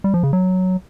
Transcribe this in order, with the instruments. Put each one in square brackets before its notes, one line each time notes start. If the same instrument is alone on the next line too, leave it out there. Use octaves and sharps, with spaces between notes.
[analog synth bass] G3
F3
C#3
F#3